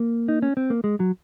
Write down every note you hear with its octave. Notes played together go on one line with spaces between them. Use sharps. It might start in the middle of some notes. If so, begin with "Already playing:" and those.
Already playing: A#3
D#4
C#4
C4
A#3
G#3
F#3